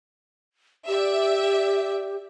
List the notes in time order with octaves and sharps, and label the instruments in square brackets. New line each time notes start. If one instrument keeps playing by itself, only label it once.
[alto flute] G4 [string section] D5 E5